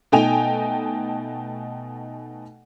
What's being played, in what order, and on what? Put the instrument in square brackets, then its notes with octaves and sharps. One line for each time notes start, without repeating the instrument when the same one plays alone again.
[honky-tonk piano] B2 A3 D#4 G5 G#5 F7